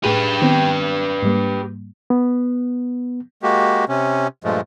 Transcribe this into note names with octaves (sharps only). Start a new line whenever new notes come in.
A2 G4 G#4 B4 D#7
D#3 B3 C4
G#2 G3 A#3
B3
G#3 A#3 F#4 G4
C3 C#4
G2 A#2 F3 G#3 A3